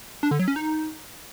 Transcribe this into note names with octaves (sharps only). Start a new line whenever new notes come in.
D4
D3
F#3
C#4
D#4